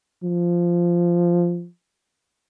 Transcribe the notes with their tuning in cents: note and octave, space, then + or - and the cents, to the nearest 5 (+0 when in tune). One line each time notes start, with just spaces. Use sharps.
F3 -5